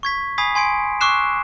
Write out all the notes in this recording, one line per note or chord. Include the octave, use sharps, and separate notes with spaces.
C#6 G#6 B6
G#5 B5 D#6 G#6 B6 C7
G#5 C6 G#6 D7
C#6 D6 E6 F#6 C7 E7